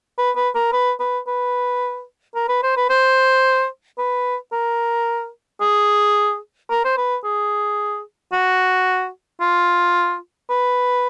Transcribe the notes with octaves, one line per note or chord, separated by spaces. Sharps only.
B4
B4
A#4
B4
B4
B4
A#4
B4
C5
B4
C5
B4
A#4
G#4
A#4
C5
B4
G#4
F#4
F4
B4